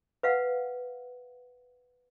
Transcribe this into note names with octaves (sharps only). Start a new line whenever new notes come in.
B4 F5 F#5